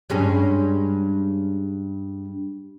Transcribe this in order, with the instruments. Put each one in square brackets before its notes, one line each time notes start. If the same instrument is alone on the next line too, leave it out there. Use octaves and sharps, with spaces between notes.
[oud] G2 G#3 C#4